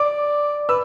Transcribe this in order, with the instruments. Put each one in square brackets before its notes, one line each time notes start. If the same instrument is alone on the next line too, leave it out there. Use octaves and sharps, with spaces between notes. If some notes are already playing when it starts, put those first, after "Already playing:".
Already playing: [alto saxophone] D5 [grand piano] D6
[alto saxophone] B4 [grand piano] E6